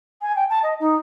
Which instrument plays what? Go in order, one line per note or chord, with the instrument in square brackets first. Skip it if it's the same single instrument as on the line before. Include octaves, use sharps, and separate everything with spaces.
[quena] G#5
G5
A5
D#5
D#4